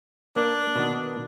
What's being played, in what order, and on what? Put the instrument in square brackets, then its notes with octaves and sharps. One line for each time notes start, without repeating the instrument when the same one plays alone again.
[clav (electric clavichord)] A#3 D5 [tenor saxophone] D4 [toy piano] A#4
[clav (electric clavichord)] B2 D#3 B3